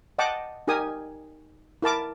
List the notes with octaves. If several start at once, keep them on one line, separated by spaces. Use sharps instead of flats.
D#5 F#5 G5 A5 D6
D#4 G4 A#4 G#5 D#6
E4 A#4 A5 D6